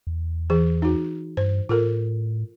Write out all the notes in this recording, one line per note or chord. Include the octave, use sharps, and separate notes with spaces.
E2
E3 G#4
D#4 F#4
G2 C5
A2 F4 A4 A#4